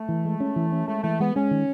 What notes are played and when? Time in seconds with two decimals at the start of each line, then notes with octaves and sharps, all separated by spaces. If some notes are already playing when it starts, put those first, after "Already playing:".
Already playing: A3
0.09 E3
0.25 G#3
0.40 C#4
0.56 E3
0.72 C#4
0.87 G#3 A3
1.03 E3 A3
1.20 G#3 B3
1.36 G#3 C#4
1.51 D#3